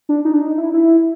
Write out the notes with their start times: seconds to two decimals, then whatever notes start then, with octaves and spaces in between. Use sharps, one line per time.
0.09 D4
0.25 D#4
0.33 D4
0.41 D#4
0.58 E4
0.74 E4